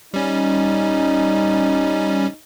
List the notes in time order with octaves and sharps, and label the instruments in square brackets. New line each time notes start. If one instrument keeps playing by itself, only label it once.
[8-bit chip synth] G3 C#4 [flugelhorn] D#4